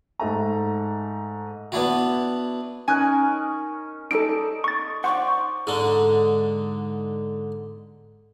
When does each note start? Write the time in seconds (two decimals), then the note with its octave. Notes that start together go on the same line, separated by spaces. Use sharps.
0.19 G#2 A3 A#5
1.72 B3 D4 E4 F#4
2.88 C#4 D#4 A#4 G#5 F#6
4.11 D#4 A4 D5 A5 D7
4.64 C#6 A6
5.04 C5 D5 F#5 C#6
5.67 G#2 D3